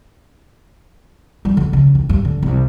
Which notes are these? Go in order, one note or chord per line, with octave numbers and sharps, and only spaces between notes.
G3
D3
C#3
D#3
G2
D3
C2